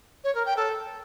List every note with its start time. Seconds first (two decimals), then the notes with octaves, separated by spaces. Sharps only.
0.24 C#5
0.35 A#4
0.46 G5
0.57 A4